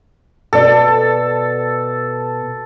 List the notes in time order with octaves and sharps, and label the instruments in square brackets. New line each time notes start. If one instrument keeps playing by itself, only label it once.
[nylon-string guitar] B2 D5 [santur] A4